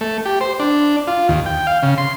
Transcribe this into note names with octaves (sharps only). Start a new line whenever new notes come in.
A3
G4
C5
D4
F4
D#2
G5
F5
C#3
C6